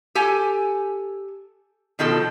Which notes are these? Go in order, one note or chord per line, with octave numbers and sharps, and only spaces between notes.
G4 A4 G#5
B2 D#3 F3 A4